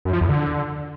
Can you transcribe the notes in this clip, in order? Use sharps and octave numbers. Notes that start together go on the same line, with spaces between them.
F#2
F3
E2
D3